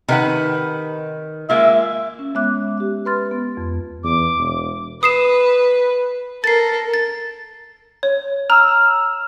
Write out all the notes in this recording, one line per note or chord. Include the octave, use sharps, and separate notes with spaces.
C3 D#3 B4 F#5
G#3 A#3 F4 E5
C#4
G#3 B3 C#5 E5 D6 F#6
G4 E5
B4 B5 C6 F6 A6
B3
F2
E2 D6
E1
B4 D#6 C7 E7
A4 A#4 A6 C7
A6
C#5
A#5 E6 F6